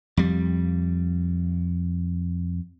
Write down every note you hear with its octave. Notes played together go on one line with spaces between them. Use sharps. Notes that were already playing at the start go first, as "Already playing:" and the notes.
F2 G3